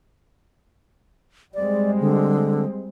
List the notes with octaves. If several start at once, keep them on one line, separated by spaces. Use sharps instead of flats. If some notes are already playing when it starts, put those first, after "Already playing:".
G3 G#3 C4 D5
D3